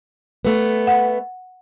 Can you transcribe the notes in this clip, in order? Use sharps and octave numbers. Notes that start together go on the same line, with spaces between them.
A3 B3
F#5